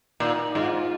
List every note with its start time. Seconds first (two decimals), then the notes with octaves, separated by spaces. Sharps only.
0.20 A#2 D#4
0.55 G#2 F4